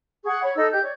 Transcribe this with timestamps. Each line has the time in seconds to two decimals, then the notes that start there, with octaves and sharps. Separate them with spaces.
0.24 G#4 F#5 C#6
0.42 C#5 B5
0.55 D#4 A4 E6
0.71 G4 D#5 G6
0.82 C#5 D5